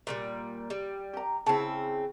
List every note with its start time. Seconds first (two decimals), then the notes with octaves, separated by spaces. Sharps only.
0.07 A#2 F3 G3
0.70 G3
1.13 G4 A#5
1.46 C#3 C4 E4 A5